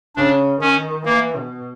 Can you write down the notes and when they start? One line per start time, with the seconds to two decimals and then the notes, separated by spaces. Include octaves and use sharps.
0.16 C#3 D4
0.61 D#3 C#4
1.06 E3 A#3
1.36 B2